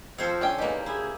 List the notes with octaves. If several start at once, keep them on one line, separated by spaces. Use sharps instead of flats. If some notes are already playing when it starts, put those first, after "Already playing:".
F3 C4 A4 C5 C#5
C#4 D4 G5
E2 A#3 D#4 G4
D2 E4 G#4